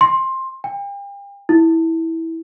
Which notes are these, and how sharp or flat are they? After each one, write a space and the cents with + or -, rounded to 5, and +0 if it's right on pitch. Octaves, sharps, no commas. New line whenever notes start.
C6 +15
G5 +40
E4 -15